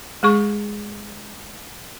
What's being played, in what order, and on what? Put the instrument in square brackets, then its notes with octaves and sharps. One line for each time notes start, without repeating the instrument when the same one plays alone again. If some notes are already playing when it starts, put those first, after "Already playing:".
[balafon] G#3 G#4 C#6